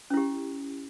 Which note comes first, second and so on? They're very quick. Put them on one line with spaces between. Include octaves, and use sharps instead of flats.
C#4 E4 G4